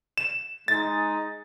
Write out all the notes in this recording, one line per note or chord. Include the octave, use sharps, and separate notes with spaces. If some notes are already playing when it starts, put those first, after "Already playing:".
E7
G#3 D#4 A6